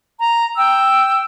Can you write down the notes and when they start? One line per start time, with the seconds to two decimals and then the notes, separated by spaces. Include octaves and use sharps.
0.19 A#5
0.55 G5 E6